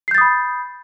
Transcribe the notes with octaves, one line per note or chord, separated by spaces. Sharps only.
B5 D#6 G6 A6 C7